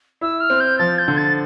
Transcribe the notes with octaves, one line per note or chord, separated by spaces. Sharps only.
E4 E6
F6
C4
G6
F3 A6
G6
D3
A6